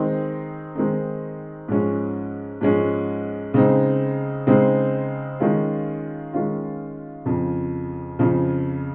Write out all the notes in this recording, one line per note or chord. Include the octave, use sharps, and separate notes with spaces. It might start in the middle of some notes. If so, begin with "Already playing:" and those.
Already playing: D#3 G#3 C4 D#4
D#3 G#3 C4 D#4
G#2 F3 G#3 C#4
G#2 F3 G#3 C#4
C#3 G#3 C4 D#4
C#3 G#3 C4 D#4
D#3 G#3 C#4 F4
D#3 G#3 C#4 F4
F2 C#3 F3
F2 C#3 F3